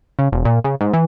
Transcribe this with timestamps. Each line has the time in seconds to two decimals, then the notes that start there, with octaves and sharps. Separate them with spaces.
0.19 C#3
0.32 E1
0.45 A#2
0.64 C#3
0.81 G#2
0.93 E3